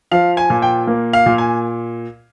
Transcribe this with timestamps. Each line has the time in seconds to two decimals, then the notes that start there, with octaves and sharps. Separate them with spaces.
0.11 F3 F5
0.37 G#5
0.50 A#2
0.62 G5
0.87 A#3
1.13 F5
1.26 A#2
1.38 G#5